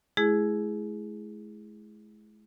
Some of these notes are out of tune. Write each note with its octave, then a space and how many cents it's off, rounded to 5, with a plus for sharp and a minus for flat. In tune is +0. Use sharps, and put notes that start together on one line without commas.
G#3 +45 E4 +0 G#4 +0